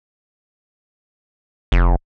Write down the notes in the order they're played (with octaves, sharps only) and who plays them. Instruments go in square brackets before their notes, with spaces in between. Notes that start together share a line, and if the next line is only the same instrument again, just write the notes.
[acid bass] F1